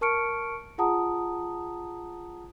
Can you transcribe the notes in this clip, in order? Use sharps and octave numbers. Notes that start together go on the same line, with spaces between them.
A#4 A5 C#6 F6 C#7 D7
F4 G#4 F#5 A5 A#5 D#6